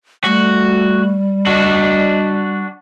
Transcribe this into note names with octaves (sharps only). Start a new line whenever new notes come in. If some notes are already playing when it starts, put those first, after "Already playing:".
G3 A3 F#4
D4 F#4 D#5